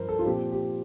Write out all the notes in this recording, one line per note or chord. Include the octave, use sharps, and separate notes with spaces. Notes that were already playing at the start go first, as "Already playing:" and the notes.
Already playing: G2 F3 A#4 C5
A4
F4
A#2 F3 C4 G4
G4